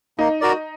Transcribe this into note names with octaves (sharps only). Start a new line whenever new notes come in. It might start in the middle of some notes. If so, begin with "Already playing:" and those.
A#3 D#4
F#4 A#4 D5